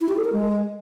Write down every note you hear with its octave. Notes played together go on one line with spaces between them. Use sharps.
E4
G4
A4
A#4
G#3